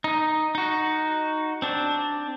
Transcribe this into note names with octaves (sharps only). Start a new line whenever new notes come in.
D#4
D#4 F#4
C4 D4